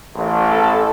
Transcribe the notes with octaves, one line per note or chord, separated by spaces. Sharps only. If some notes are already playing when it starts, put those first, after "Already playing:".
A1
A4